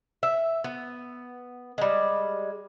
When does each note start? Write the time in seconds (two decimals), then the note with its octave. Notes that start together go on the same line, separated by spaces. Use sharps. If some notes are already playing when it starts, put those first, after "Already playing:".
0.23 E5
0.64 B3
1.78 G3 G#3